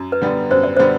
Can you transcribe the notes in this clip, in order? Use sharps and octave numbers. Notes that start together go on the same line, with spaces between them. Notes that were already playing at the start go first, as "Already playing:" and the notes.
Already playing: F#2
B4
D3 G3 B3
F#2 C5
D5
D3 G3 B3 C5